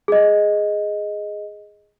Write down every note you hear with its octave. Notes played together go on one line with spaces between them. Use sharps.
G#4 D#5